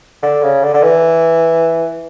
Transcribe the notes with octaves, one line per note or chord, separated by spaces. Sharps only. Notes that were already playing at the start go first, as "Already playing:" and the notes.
D3
C#3
D3
D3
E3